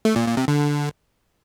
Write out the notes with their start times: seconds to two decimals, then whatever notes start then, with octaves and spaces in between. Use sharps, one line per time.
0.05 A3
0.16 A#2
0.27 A#2
0.37 C3
0.48 D3